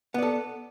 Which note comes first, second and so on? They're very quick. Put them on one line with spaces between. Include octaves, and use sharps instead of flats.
B3 D5 A4